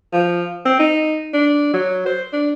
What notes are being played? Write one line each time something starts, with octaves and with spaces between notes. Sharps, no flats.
F3
C4
D#4
D4
F#3
C5
D4